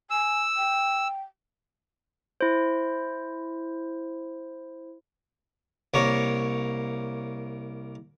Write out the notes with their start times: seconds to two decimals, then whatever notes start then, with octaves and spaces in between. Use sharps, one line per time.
0.10 G#5 E6
0.57 G5
2.41 E4 C5
5.94 C2 A#3 C#5